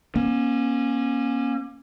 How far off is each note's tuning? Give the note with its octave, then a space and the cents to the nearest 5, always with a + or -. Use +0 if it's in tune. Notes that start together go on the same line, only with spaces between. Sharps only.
A#3 +35 C#4 -15